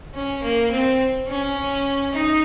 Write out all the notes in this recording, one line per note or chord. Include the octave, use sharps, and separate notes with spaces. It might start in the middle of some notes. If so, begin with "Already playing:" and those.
C#4
A#3
C4
C#4
D#4